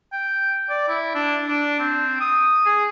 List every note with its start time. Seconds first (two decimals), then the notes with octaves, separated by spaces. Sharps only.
0.13 G5
0.69 D5
0.89 E4
1.15 D4
1.47 D4
1.80 C4
2.20 D#6
2.66 G#4